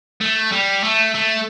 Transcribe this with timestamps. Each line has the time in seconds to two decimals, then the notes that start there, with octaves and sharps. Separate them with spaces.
0.21 A3
0.52 G3
0.83 A3
1.14 A3